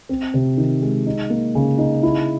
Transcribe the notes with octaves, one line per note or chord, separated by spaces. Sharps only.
C4
C3
D#3
G#3
D#4
A#3
C#3
D#4
E4